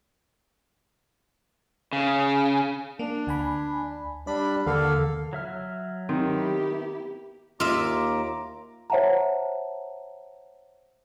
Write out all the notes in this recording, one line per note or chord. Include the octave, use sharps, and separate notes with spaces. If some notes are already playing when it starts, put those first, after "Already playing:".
C#3
A#3 D4
D2 G#5 B5
G3 D4 D5 B5
D#2 D3 A#3 A4 F5
F#3 E5 F6
D#3 B3 C4 E4 G4
D#2 F4 E5 A#5 D6
C5 C#5 E5 F#5 A5 A#5